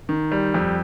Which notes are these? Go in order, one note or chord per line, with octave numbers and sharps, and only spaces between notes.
D#3
G3
F2